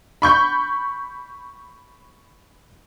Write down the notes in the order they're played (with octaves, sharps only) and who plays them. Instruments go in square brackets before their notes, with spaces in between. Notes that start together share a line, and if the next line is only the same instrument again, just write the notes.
[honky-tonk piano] B5 C#6 G6